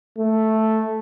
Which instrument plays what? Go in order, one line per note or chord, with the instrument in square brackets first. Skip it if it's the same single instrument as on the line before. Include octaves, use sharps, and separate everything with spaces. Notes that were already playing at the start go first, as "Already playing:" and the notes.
[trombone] A3